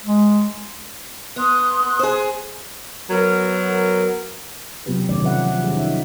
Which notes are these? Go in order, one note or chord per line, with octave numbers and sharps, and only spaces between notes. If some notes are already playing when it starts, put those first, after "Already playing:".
G#3
B3 C6 D#6 F#6
G#4 C5
F#3 B3 A#4
C3 F#3 B3 F4 G4 B4
D#3 A3 C4 C#4 D#4 D5
C3 F3 B4 E5 F#5
F3
D#3 G3 C#4 G#4
D#4 E5